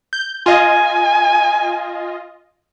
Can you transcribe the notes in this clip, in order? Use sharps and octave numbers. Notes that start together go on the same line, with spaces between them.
G6
F4 D#5 G#5